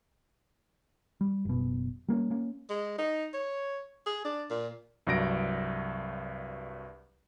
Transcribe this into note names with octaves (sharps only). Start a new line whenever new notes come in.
G3
F#1 B2
G3 A#3 C4 C#4
A#3 C#4
G#3
D#4
C#5
G#4
D4
A#2
C2 G2 F#3 A#6 D7